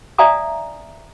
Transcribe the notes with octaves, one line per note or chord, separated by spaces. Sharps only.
D5 E5 F5 G#5 A#5 D#6